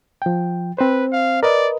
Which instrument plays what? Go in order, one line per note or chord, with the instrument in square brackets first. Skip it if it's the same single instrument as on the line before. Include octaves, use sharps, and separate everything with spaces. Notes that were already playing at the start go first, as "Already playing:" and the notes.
[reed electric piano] F3 G5
[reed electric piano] C4 C5 [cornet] B4
[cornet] F5
[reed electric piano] A#4 B4 D#5 [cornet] D5